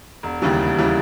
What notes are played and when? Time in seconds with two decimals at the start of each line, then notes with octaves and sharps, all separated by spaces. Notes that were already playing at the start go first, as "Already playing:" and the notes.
0.23 E1
0.42 D#2 C#3 E3 G3
0.59 E1
0.78 C#3 E3 G3